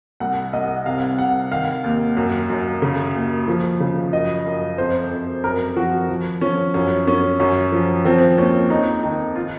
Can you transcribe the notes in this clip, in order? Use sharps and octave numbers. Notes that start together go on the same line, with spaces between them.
C2 F#5
C2 D#5
C3 F5
C3 F#5
D#3 F5
D#2
F#2
F#2
C#3
D#2
F3
C#3
F#2 D#5
F#2
F2 C5
F2
F#2 A#4
F3 F#4
F3
F3 C#4
F#2 C#4
F#2 C#4
F#2 C#4
F3
F3 C4
D#2 C#4
F2 D#4
D#3 D#4
F4